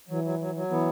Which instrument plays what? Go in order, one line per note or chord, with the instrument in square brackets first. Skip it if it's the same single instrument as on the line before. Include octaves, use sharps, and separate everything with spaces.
[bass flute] E3 [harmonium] F#3
[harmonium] F#3
F#3
F#3
[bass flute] E3 [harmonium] B3